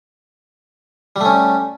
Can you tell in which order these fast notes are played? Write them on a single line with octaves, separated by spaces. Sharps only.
G3 A3 C#4